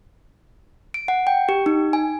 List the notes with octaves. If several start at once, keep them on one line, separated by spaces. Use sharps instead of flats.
D7
F#5
G5
G4
D#4
G#5